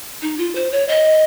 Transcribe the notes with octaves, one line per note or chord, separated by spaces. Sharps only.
D#4
F4
C5
C#5
D#5